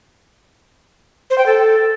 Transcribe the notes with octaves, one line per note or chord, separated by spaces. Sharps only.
C5
G5
A4